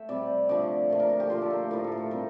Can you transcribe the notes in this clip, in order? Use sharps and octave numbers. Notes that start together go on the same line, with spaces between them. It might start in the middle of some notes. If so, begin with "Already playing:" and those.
Already playing: A3 E5 G5
C3 G3 D5
D3 F3 A3 D5
A#2 F3 A3
A#4
A#4
G4
A#2 F3 A3 C5
A4
A#4
A2 F3 A3 A#4
A4
A#4
A4
C3 G3 A#4